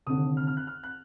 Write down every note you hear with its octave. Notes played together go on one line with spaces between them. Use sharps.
F1 D#2 D3 D#6
F6
F6
F#6
F6
F#6